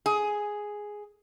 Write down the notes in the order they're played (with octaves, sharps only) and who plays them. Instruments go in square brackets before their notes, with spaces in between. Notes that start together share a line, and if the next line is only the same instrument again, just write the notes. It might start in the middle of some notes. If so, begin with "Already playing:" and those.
[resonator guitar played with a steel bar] G#4